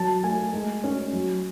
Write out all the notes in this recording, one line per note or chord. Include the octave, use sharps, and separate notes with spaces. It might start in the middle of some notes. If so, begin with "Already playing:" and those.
Already playing: F#3 A5
A3 G#5
G#3
C#4
F#3